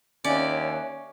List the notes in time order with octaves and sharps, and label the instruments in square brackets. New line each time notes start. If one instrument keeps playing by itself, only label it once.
[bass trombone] D#2 [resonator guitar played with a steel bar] C#4 [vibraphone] C#5 E5 G#5 [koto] D5